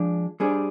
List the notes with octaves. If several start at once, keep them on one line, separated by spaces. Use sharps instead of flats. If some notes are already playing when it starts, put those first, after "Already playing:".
Already playing: F3 G#3 D4
G3 D4 G#4 C5